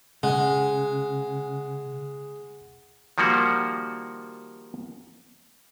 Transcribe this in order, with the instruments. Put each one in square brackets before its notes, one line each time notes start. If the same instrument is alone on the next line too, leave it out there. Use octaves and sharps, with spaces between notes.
[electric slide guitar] C#3 [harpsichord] G#3 [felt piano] F#5
[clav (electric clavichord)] D#3 F3 G3 A#3 F#4